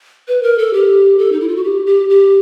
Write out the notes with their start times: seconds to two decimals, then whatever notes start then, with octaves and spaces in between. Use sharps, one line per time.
0.28 B4
0.43 A#4
0.58 A4
0.74 G4
1.19 A4
1.32 D#4
1.40 E4
1.48 F4
1.56 F#4
1.64 G4
1.86 G4
2.10 G4